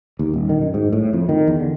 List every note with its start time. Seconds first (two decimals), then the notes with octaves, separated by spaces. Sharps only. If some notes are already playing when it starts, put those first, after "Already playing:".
0.19 D#2
0.34 D#1
0.49 D#3
0.61 F#2
0.74 G#2
0.93 A2
1.13 F2
1.29 D#3
1.47 E2
1.60 D3